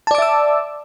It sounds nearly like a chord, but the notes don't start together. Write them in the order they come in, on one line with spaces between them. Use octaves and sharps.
A5 D5 D6 E5 E6